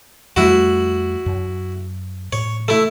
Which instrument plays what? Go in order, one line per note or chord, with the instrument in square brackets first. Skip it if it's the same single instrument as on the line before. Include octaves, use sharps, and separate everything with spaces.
[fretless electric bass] F2 G3 A3 [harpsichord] E4 F#4
[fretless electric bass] F#2
[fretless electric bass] A2 [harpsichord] C#5
[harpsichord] A3 E4